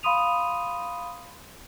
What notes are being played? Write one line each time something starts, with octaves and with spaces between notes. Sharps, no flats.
F5 B5 C6 D#6 D#7 F7